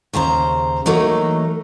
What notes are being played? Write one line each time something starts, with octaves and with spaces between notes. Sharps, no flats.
D#2 C#3 C5 A#5
E3 F#3 A3 A#3 D#4